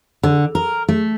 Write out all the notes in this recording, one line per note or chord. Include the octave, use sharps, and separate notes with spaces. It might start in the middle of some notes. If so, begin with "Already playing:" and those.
D3
A#4
A3